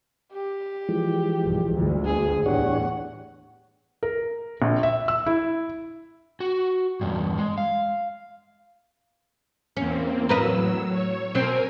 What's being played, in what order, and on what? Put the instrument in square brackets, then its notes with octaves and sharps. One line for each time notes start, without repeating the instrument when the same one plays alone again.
[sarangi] G4
[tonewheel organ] E3 F3 G#3
[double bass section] B1 G2
G1 D2 G2
[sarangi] G#4
[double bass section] E2 A2 [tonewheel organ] D4 G4 C#5 [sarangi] F#5
[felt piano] A#4
A#1
E5
E6
E4
[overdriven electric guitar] F#4
E2 G2
G#3
F5
[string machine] E2 A#3 C4 [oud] C#4
[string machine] A2 F#3 E6 [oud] A#4 B4 D#5
[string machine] C#5
[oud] B2 C4 [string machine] A#4 G#5